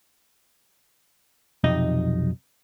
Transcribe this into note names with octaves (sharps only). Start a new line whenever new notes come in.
B1 F2 C3 D#4 D#5